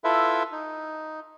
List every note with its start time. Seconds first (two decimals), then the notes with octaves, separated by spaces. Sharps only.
0.04 E4 F4 A4 B4 E5
0.52 D#4